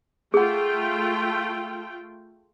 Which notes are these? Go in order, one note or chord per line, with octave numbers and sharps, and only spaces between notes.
A3 F4 G#4 F#5 G5